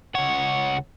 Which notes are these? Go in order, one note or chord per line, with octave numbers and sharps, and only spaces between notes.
C#2 C#5 F#5